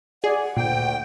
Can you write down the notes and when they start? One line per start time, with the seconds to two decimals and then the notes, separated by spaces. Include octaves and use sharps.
0.24 G#4 D5 F#5
0.56 D2 A#2 G5